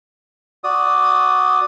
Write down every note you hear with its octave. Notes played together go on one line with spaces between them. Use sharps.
F#4 D5 D#6